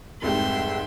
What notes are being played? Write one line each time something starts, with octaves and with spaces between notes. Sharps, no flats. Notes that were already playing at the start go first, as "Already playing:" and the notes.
F1 C2 G#2 E5 G5 C6